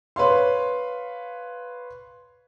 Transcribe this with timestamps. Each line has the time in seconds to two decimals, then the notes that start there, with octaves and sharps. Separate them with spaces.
0.16 B4 C#5 F5 C6